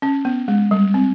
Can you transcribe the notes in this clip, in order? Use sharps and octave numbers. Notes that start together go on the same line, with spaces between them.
C#4
B3
G#3
G3
C4